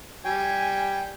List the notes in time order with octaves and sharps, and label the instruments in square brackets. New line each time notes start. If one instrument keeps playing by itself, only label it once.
[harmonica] G3 [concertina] G5 [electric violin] G#5